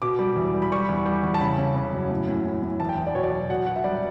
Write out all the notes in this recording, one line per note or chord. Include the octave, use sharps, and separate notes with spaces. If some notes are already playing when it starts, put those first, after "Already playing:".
B2 D6
G3
E2
G3
B5
G3 C#6
E2
G3
E2
A5
C#3 B5
C#3
C#3
F#2
A2
A2
A2
A2
E2 A5
G5
E2
D5
B2 C#5
D5
F#3
B2 F#5
B2 F#5
E5
G3 D5